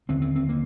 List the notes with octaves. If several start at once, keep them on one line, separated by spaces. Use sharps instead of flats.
D#2 D3 C4
C4
C4
A#3